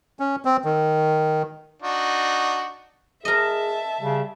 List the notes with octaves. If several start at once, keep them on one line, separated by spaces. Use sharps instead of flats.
C#4
C4
D#3
D4 D#4 F#4
G#4 A#4 D#5 E5 A5
C#3 G3